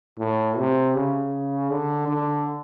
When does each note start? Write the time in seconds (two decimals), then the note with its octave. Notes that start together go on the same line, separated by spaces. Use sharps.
0.19 A2
0.57 C3
0.94 C#3
1.70 D3
2.08 D3